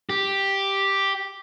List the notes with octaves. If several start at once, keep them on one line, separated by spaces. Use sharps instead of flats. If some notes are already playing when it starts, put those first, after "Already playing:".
G4